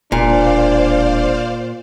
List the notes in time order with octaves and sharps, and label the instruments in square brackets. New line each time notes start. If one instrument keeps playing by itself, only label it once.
[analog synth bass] E1 [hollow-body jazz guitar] A#2 [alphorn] D4 [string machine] C5 D5 F5